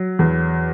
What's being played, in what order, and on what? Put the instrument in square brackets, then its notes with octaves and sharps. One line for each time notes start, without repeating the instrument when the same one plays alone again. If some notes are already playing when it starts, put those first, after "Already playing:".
Already playing: [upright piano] F#3
E2